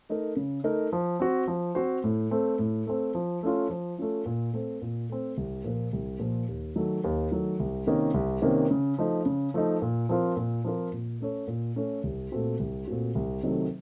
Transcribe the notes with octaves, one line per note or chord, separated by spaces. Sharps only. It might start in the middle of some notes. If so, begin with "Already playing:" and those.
A3 D#4 A#4
C#3
A3 D#4 A#4
F3
C4 F#4 C5
F3
C4 F#4 C5
A2
A3 C4
A2
A3 C4
F3
A3 C#4 F4
F3
A3 C#4 F4
A#2
A3 C4
A#2
A3 C4
C2
A#2 F3 A#3
C2
A#2 F3 A#3
D#2
D#3 F#3 A3
D#2
D#3 F#3 A3
C2
C3 D#3 A#3 C#4
C2
C3 D#3 A#3 C#4
C#3
F3 A3 D#4
C#3
F3 A3 D#4
A#2
F3 C4 F4 A#4
A#2
F3 C4 F4 A#4
A#2
A3 C#4 A4 C#5
A#2
A3 C#4 A4 C#5
C2
A#2 A3 C4 F#4
C2
A#2 A3 C4 F#4
C2
C3 D#3 F#3 A3